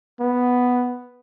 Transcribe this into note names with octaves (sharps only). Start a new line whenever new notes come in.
B3